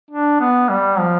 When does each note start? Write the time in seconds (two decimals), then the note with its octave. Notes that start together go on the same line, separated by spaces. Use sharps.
0.11 D4
0.40 B3
0.69 G3
0.99 F3